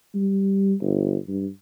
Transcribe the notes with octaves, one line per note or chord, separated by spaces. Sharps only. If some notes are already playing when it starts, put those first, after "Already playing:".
G3
G1
G2